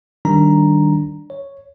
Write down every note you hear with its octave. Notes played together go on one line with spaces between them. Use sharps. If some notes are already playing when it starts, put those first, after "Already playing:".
D#3 G3 D4 A#5
C#5